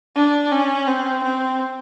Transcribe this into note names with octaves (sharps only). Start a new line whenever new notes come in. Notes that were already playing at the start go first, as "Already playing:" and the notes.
D4
C#4
C4
C4